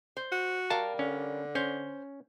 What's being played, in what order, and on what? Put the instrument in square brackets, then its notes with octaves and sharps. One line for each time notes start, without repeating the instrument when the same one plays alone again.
[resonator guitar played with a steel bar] C5
[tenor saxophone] F#4
[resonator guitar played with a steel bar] G3 A#4 F5 [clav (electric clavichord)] A5
[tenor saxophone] D3 [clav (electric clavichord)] C#4
[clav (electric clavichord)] C#4 [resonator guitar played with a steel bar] C5